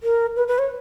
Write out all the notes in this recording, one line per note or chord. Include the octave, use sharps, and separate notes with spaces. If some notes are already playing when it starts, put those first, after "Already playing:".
A#4
B4
B4
C#5